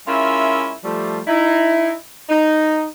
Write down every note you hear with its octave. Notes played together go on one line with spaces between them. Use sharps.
G#3 C#4 E4 F4 A#4 E5
F3 G3 A3
D#4 E4
D#4